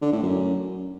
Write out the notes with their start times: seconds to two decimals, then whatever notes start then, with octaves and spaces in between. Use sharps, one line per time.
0.02 D3
0.12 A2
0.23 F#2